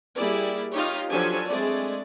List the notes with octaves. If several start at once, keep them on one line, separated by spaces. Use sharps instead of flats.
G3 A#3 E4 G#4 D5
D#4 F4 G4 C#5 D#5 F5
F3 F#3 D4 G4 A4 G#5
G#3 A3 C4 G#4 D5